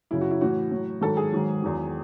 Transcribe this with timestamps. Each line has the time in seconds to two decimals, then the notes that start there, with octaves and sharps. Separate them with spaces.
0.11 F#2 C#3 F#3 E4
0.21 F#4
0.31 E4
0.41 A2 E3 F#4
0.71 A2 F#3
1.01 G#2 D#3 F#3 A4
1.17 G#4
1.32 G#2 D#3 F#3
1.62 E2 D#3 F#3